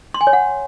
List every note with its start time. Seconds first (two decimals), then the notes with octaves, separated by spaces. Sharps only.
0.14 C6
0.21 G#5
0.27 C#5
0.33 F#5